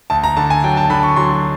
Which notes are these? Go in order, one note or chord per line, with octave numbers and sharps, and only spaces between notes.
D2 A5
A#5
D3 A5
G#5
F#3 G5
A5
D3 B5
C#6
F#3 C6